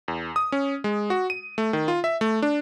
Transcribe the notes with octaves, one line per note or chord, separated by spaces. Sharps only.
E2
D#6
C#4
G#3
F#4
D#7
A3
D#3
F4
E5
A3
D4